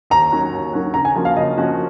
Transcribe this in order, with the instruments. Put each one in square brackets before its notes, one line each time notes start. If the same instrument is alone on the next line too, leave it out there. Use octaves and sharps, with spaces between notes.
[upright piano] D#2 [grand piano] A#5
[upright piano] D#3 F#3 C#4 F#4
D#2
D#3 F#3 C#4 F#4
[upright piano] C#3 [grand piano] A#5
[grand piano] G#5
[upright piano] F3 A#3 C#4 F#4
[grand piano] F5
[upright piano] C#3 [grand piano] D#5
[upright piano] F3 A#3 C#4 F#4